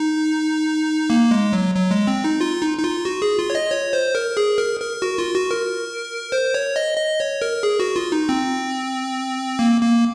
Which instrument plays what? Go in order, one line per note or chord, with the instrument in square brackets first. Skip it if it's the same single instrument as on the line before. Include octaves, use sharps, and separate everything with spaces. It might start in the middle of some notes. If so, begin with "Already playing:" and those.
Already playing: [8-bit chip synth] D#4
A#3
G#3
F#3
F#3
G#3
C4
D#4
F4
D#4
D#4
F4
F#4
G#4
F4
C#5
D#5
C#5
C5
A#4
G#4
A#4
A#4
F#4
F4
F#4
A#4
C5
C#5
D#5
D#5
C#5
A#4
G#4
F#4
F4
D#4
C4
A#3
A#3